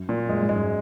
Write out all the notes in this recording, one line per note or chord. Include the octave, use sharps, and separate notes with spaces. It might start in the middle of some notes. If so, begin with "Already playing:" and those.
Already playing: F#2
A#2
F#2 G#3
G#2
G#3
F#2